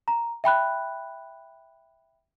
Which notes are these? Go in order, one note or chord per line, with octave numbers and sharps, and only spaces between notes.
A#5
E5 G5 B5 F#6